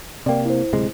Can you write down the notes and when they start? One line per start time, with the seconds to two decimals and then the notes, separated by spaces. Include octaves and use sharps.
0.26 C3 A#3 D5 G5
0.45 E4 C5
0.73 D1 C3 G#3